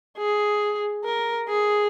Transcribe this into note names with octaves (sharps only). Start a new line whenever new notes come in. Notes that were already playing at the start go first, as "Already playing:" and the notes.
G#4
A#4
G#4